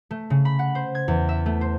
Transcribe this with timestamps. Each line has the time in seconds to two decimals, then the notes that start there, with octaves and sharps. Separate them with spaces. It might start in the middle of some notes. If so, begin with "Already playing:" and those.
0.11 A3
0.30 C#3
0.45 B5
0.59 F#5
0.75 C5
0.95 G#6
1.08 E2
1.29 E5
1.46 A3
1.61 C5